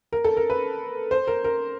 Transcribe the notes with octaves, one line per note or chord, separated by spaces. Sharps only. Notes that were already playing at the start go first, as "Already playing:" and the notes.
A#4
A4
A#4
B4
C5
A#4
A#4